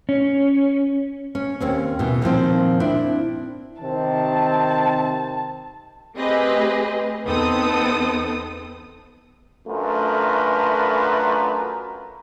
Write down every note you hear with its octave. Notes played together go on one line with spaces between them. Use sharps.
C#4
C#4
D#2 C4 C#4
B2 E3
A#2 D#3 F3 C4
C4 D4 E4
C3 D#3 C4 A5
A3 C4 G4 G#4 B4 D#5
E2 B3 C4 D#4 A4 D#6
F#2 A3 D4 F4 A#4 B4